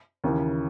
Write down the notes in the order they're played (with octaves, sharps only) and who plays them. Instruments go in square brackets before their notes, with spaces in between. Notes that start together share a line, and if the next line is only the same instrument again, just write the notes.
[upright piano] D#2 C#3 E3